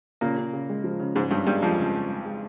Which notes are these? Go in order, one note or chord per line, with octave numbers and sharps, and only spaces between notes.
A#2 C#3 A#3
C#3
C#3
G#3
F3
C#3
G#2 C#3 G#3
G2 C#3 G3
G2 G3 G#3
F2 F3 G#3
C#3
G#3
G#3
G#3